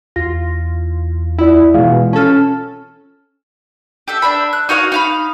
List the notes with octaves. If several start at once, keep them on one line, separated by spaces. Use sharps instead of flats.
E2 F4 A#6
E4 F4 D5
B2 E3 G#3 F4 F5
C#4 A4 A5 F6
G4 A4 E5
D4 E5 B5
F#6
D#4 F#4 C#5 F5
D#4 F5 B5